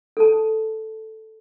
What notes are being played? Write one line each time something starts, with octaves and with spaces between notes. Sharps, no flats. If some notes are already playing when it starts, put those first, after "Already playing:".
A4 A5